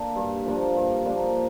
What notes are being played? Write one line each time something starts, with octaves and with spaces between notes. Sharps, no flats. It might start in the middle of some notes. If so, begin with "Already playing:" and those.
Already playing: A#3 D4
G2
F3 A#3 D4
G2
F3 A#3 D4